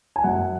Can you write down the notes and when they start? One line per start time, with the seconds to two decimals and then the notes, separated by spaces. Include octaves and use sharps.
0.16 G#5
0.24 F#2 F#5